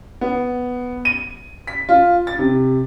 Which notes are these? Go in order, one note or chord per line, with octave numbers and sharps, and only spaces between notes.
B3
D#7
B6
F4
A6
C3